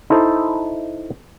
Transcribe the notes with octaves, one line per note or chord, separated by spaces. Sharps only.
D#4 E4 A4 C5